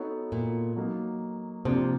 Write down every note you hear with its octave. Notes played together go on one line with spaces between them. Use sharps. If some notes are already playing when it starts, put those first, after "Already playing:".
Already playing: B3 D#4 F#4 A4 C#5
A#2
F#3 A#3 D#4
C3 F3 A#3 D4